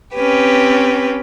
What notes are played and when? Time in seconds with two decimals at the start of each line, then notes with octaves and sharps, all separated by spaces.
0.15 C4 C#4 G4 B4